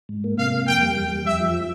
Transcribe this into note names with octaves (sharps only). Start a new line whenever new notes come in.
G#2
A#3
C3 F5
A#3
F2 G5
G3
E2
G3
F2 E5
F3